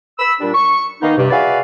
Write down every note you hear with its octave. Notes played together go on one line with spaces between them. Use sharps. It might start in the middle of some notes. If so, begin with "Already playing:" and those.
B5 E6
A#2 G3 D4
C#6
D#3 A#3 B3 D#4
G2 C3
F#4 G#4 B4 D5 E5 F5